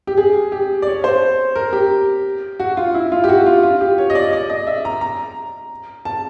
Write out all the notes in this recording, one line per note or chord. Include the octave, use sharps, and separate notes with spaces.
G4
G#4
G4
D5
C#5
C5
A#4
G4
F#4
F4
E4
F4
G4
F#4
F4
F4
G4
C#5
D#5
D5
D5
D#5
E5
A#5
A#5
A5